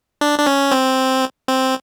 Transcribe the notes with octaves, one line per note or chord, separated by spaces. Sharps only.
D4
D4
C#4
C4
C4